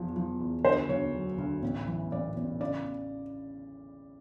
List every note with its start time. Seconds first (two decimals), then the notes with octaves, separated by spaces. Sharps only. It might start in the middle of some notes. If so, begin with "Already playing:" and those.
Already playing: E2 F3
0.16 F3
0.40 E2
0.65 D2 C5
0.89 D2 C#5
1.13 F#3
1.38 D2
1.62 A1
1.87 E3
2.12 A1 D5
2.37 A1
2.60 C#3 D5